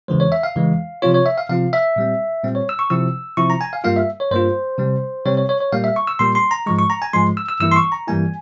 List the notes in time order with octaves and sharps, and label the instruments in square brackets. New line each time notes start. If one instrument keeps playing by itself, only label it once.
[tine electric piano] E2 C#3 E3 G#3 C5
C#5
E5
F5
E2 C#3 E3 G#3
C3 F3 C4 F4 C#5
C#5
E5
F5
C3 F3 C4 F4 F5
E5
A#2 G3 C4
A#2 G3 C4
C#5
E6
C#6
C3 F3 C4 E4 E6
C3 F3 C4 E4 C#6
A#5
G#5
F5
G2 G3 A#3 F4 F5
E5
C#5
G2 G3 A#3 F4 C5
C3 G3 C4
C3 G3 C4 C#5
C#5
C#5
C#5
A#2 G3 A#3 F5
E5
C#6
E6
A#2 G3 A#3 C6
C6
A#5
G#2 F3 G#3 C#6
C#6
A#5
G#5
G#2 F3 G#3 C6
E6
E6
G2 E3 G3 A#3 E4 E6
C6
C#6
A#5
G2 E3 G3 A#3 E4 G#5